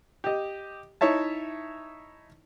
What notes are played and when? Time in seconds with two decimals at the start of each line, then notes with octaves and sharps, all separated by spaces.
0.24 G4 D#5
1.01 D#4 E4 C#5 E5 A5